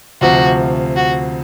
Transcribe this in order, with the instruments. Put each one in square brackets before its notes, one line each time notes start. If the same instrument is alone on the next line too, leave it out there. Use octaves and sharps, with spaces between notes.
[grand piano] D2 C3 F3 [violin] F#4
[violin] F#4